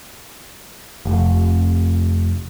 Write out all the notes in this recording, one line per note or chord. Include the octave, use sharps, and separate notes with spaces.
F1